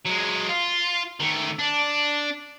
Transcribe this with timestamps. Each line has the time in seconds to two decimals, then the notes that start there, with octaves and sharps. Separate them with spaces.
0.05 F#3 G#3
0.49 F4
1.20 D#3 A3
1.59 D4